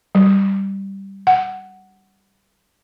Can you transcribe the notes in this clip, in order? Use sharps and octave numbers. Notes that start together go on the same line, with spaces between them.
G3
F#5